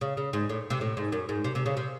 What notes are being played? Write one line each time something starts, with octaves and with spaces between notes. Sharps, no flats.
C#3
C#3
G#2
A2
C3
A2
G#2
F#2
G#2
C3
C3
C#3
C3